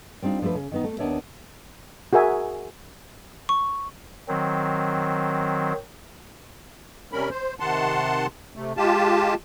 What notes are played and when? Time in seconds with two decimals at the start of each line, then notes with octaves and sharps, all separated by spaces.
0.22 G3 C4 D4 D#4 F4
0.42 F3 A3 D4 A4 B4
0.55 C#3
0.71 D#3 B3 D#4
0.84 A3
0.99 D#2 B3 D4 C#5 E5
2.13 F#4 G#4 A#4 E5 G#5
3.49 C#6
4.28 D#3 F#3 C4
7.13 C3 G3 C#4 A#4 B5
7.30 C5
7.60 C3 D#3 F#5 A5 C6
8.56 C3 A3
8.77 G#3 F4 G4 A5